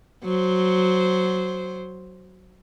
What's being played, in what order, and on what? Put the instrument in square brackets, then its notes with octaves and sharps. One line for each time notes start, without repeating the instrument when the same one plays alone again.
[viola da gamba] F#3 C5